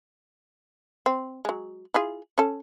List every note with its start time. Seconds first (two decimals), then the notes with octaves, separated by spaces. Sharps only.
1.06 C4
1.45 F#3 G#3
1.94 E4 F4 G#4
2.38 C#4 A4